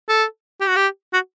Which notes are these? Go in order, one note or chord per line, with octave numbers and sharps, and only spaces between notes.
A4
G4
F#4
G4
F#4